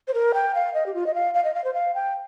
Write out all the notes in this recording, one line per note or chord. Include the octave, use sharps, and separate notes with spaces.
C5
A#4
G5
F5
D#5
G4
F4
D#5
F5
F5
D#5
F5
C5
F5
G5